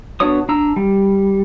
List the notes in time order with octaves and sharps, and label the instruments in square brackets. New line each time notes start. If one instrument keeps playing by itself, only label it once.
[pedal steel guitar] B3 D4 F#4 C#5 D#6
D4 A#5 E6
G3